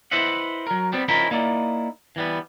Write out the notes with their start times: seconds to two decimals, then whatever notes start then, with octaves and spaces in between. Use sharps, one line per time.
0.11 E4 B4 C5 D#5 E5 F#5
0.67 F#3 A#4
0.92 G3 B3 C4
1.08 F3 C#4 D#4 E4 A#4 B5
1.31 A#3 D#4 E4 D5
2.16 E3 G3 B3